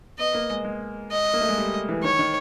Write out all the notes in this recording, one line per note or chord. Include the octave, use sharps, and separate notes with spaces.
B3 D#5
A#3
G#3
G#3
D#5
A#3
A3
G#3
G3
E3
D#3 C#5
D#3